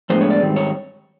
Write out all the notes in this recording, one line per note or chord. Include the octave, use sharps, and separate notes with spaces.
A2 F3 G#3 B3 D4 C5
C#5
D5
G#2 D#3 G3 C4
C#5